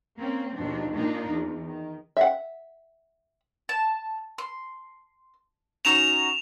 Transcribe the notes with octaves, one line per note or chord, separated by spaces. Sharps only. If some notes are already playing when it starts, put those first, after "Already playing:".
A#3 C4 C#4
D#2 B2 F3 D4
A#2 A#3 D4 D#4 F4
E2
D#3
E5 F#5
A5
C6
C#4 D#4 F#4 E7 F7